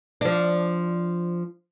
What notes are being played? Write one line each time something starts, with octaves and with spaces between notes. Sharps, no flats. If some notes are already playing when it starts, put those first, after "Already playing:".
F3 D4